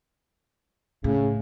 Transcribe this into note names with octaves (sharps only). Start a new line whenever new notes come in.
A2 C#3